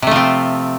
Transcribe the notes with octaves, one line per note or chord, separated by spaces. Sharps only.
C3 F3 A3 C4